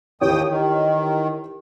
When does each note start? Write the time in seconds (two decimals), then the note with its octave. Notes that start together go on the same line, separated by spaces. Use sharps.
0.21 D#2 E3 G4 C#5 G5 D#6
0.50 D#3